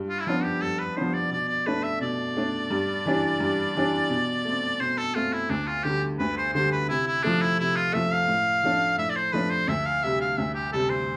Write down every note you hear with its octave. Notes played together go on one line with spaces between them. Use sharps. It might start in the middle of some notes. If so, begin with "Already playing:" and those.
Already playing: G2
F4
E4
F3 B3 D4 F4
G4
G2 A4
B4
F3 B3 D4 C5
D5
B2 D5
D5
A3 D4 B4
E5
B2 D5
A3 D4
G2
E3 G3 D4
G2
E3 G3 D4
B2
A3 C4
B2 C5
A4
A3 C4 F4
E4
D2 D4
F4
D3 G3 G4
D2 B4
C5
D3 G3 C5
B4
C3 E4
E4
F3 A3 D4
E4
C3 E4
F4
F3 A3 E5
F5
A2
F3 A3 D4
A2 E5
D5
C5
F3 A3 D4 B4
C5
D2 E5
F5
C3 G3 E5
F5
D2 E5
G4
C3 G3 A4
C5